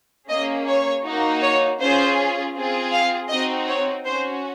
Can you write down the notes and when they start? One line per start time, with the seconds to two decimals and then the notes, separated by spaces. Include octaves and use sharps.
0.29 A#3 C#4 G#4 D#5
0.66 C#5
1.04 A#3 D#4 F#4
1.42 C#5
1.79 C#4 F4 G#4 C5
2.54 C4 F4 G#4
2.92 F5
3.28 C4 D#4 F#4 D#5
3.66 C#5
4.03 C#4 F#4 C5